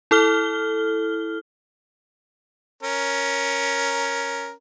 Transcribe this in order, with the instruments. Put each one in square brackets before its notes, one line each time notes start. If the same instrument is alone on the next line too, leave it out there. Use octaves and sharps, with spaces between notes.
[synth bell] E4 A4 F6 G7
[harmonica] C#4 A#4